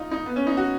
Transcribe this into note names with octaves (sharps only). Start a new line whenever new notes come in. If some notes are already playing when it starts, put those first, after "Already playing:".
Already playing: D#4 F4
D#4
B3
C#4
D#4
F#4